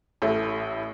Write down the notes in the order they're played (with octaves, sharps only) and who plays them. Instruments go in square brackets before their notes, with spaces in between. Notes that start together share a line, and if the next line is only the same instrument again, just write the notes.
[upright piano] A1 A2 A3